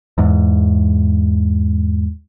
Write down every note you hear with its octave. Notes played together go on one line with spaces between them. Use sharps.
E2 G#2